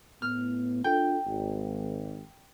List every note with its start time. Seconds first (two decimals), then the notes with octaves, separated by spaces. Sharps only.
0.22 A2 B3 F6
0.84 D4 F4 A4 G5
1.26 G#1